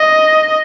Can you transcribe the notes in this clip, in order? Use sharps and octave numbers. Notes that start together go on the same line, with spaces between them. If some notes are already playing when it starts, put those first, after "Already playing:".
Already playing: D#5